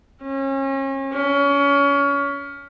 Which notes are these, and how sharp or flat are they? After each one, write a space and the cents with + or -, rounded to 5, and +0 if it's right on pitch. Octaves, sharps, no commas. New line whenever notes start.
C#4 -35
C#4 +25